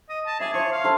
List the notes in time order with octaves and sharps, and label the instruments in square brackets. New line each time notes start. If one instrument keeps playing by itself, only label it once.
[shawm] D#5
A5
[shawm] G#4 [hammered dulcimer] E5 D6
[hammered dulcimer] F3 [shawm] C#5
[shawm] F5
[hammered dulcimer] F3 A4 C6